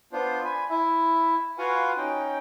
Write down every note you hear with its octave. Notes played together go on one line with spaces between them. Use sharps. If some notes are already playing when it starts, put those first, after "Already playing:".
B3 D4 F4 C5
G#5 B5
E4 E5
F4 F#4 B4 F5 F#5 G#5
C#4 D#4 G5